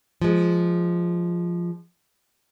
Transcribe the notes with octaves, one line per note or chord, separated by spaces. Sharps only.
F3 G#3